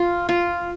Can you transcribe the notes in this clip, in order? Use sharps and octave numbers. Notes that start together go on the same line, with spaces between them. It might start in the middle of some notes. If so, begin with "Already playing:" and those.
Already playing: F4
F4